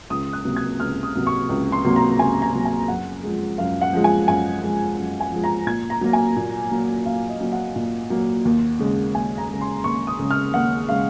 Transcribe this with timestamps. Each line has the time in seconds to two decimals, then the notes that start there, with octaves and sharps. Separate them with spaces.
0.10 C#2 D#6
0.33 F#6
0.45 C3 F#3 A#3
0.57 G#6
0.80 C#2 F6
1.03 D#6
1.15 C3 F#3 A#3
1.27 C#6
1.49 C#2
1.72 C6
1.84 C3 F#3 A#3
1.96 A#5
2.19 C#2 G#5
2.42 A#5
2.54 C3 F#3 A#3
2.65 G#5
2.88 F#2 F#5
3.23 F3 G#3
3.58 F#2 F5
3.81 F#5
3.93 F3 G#3
4.04 G#5
4.28 F#2 G#5
4.62 F3 G#3
4.97 F#2
5.20 G#5
5.32 F3 G#3
5.44 A#5
5.67 A#2 G#6
5.90 A#5
6.01 F#3 A#3
6.13 G#5
6.36 A#2
6.71 F#3 A#3
7.06 A#2 F5
7.29 D#5
7.41 F#3 A#3
7.52 F#5
7.76 A#2
8.10 F#3 A#3
8.45 D#2
8.79 C#3 G#3
9.15 D#2 G#5
9.38 A#5
9.49 C#3 G#3
9.61 C6
9.84 D#2 C#6
10.07 D#6
10.19 C#3 G#3
10.31 F6
10.54 D#2 F#5
10.89 C#3 G#3 F5